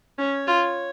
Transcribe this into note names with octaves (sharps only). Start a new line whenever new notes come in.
C#4 C#5
F4